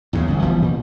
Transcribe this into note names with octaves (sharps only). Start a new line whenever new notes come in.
E2 G2 A#2 C#3
G1 C#2
E3 F3 G3 B3
A#2